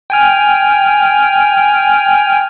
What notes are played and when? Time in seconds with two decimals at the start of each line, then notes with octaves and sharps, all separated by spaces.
0.10 G5 G#5 F6